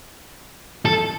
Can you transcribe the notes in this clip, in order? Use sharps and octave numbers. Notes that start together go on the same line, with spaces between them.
A4